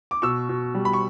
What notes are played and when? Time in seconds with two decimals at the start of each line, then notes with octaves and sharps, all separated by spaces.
0.11 D6
0.22 B2 C#6 E6
0.49 B2
0.75 G3
0.85 B5
0.93 C#6